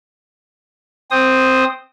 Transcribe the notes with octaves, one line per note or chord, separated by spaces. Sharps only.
C4 C5 D#6